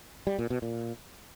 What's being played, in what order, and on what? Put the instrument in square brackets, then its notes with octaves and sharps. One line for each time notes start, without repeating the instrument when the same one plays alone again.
[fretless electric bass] G3
A#2
B2
A#2